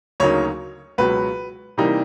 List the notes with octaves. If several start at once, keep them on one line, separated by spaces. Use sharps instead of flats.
D2 C#3 F#3 A#3 D#4 C#5
C#2 B2 F#3 B4
C3 E3 G3 A#3 D#4